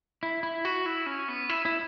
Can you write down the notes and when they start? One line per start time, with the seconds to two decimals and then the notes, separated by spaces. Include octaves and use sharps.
0.23 E4
0.43 E4
0.65 F#4
0.86 E4
1.06 C#4
1.28 B3
1.50 E4
1.65 E4